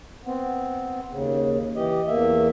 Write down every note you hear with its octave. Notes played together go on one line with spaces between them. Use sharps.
B3 C4
D#2 C#3
E3 G4 D#5
E2 A#3 E5